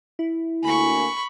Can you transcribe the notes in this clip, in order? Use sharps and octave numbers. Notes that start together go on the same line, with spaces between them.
E4
D2 A#3 G#5 B5 C#6